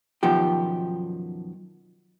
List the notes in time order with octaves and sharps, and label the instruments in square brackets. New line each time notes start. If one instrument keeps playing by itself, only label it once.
[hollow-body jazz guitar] F#2 B2 D#3 F3 G4